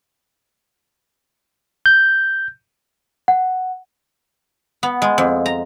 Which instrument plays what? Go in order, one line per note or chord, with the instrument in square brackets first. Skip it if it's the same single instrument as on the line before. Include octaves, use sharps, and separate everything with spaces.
[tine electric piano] G6
[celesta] F#5
[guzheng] B3
G#3
F2
A#5